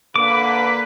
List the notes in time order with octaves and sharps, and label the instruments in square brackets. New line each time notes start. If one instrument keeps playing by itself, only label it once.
[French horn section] D3 A#3 [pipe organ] B4 [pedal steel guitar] D6